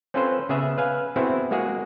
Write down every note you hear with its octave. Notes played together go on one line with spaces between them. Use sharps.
C4 C#4 F4 A4 B4 C5
C#3 B3 G#4 E5
B4 F5 G#5
B3 C4 E4 F#4 G#4 C5
G#3 A#3 F#4 G#4